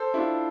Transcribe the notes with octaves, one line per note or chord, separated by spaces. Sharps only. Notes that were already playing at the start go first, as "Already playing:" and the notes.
Already playing: A4 C5
E4
D4 F4